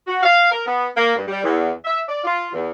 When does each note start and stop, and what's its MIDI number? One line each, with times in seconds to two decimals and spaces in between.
0.07 0.19 66
0.23 0.48 77
0.51 0.63 70
0.66 0.88 59
0.96 1.14 58
1.16 1.23 43
1.27 1.43 55
1.43 1.70 40
1.85 2.00 76
2.08 2.23 74
2.24 2.49 65
2.53 2.71 40